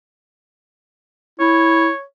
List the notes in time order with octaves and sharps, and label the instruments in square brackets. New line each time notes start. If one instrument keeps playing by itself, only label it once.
[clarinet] E4 [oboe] C#5